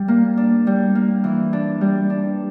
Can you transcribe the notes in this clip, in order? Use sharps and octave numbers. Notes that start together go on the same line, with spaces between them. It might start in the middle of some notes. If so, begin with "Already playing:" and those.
Already playing: G3
A#3
D4
G3
A#3
E3
D4
G3
D4